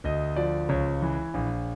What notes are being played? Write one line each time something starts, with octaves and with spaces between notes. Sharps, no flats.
D2 D#5
F3 D5
C#2 C#5
E3
A#1